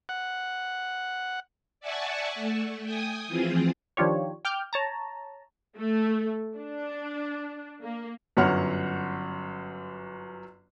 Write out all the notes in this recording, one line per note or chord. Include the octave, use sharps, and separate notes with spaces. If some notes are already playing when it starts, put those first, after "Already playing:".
F#5
D5 E5 F#5 G#5 A5 C#6
A3
G5 G#5 D#6
E3 F3 C4 F4 G#4
D#3 F3 D4 F4 G4 C#5
G5 D6 F6 G6
C#5 A5 A#5
A3
D4
A#3
G1 F#2 C#5 F#5 F6